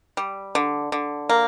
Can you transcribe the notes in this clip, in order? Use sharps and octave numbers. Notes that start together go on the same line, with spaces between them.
G3
D3
D3
A#3